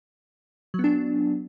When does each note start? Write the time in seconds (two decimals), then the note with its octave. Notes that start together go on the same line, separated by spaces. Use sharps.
0.74 F#3
0.79 B3
0.84 D4